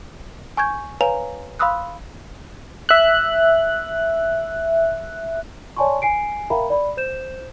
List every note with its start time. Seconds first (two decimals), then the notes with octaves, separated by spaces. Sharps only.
0.57 G#5 C#6 G6 G#6
1.01 B4 C#5 F5 G#5 A#5 F7
1.59 F5 B5 C6 D#6 E6 F#6
2.89 E5 F#6
5.77 C#5 D5 G#5 A5 C6 C#6
6.02 G#5 C7 D7
6.50 A#4 E5 F5 G5 A#5 B5
6.70 D5 B5
6.97 C5 G6 E7